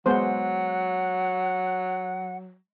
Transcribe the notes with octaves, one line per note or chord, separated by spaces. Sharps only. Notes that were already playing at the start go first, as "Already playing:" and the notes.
F#3 G#3 B3 C5 F#5